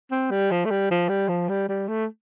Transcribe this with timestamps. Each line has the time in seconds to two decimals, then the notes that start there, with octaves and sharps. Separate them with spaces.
0.11 C4
0.31 G3
0.51 F3
0.65 A3
0.70 G3
0.91 F3
1.09 G3
1.29 F3
1.49 G3
1.69 G3
1.88 A3